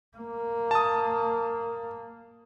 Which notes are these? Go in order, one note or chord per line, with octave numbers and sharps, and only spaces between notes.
A#3
A5 D#6